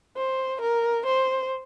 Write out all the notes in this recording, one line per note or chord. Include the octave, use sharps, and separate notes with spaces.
C5
A#4
C5